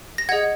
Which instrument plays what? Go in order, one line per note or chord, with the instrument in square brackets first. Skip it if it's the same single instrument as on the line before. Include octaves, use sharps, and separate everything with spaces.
[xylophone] A#6
G#4 D#5 F#5 G#6